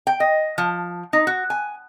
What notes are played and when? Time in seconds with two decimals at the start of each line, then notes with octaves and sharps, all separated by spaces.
0.07 G5
0.20 D#5
0.58 F3
1.13 D#4
1.27 F#4
1.50 G#5